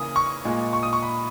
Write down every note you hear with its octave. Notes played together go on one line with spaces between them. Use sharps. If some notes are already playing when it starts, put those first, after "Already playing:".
Already playing: C#3 E3 A#3 D#6
C#6
A#2 G#3
C#6
D#6
C#6
B5